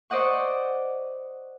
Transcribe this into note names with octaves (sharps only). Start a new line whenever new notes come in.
C5 D5 D#5 F#5 C#6